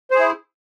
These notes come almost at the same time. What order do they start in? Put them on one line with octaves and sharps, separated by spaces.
C5 G#4 E4